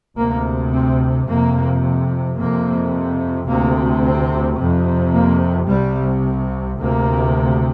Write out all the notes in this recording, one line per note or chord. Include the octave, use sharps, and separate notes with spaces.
D2 C3 A#3
C4
F2 C3 A#3
F2 C3 A#3
D2 C3 A#3
C4
F2 C3
A#3
C2 C3 G3
D2 C3 A#3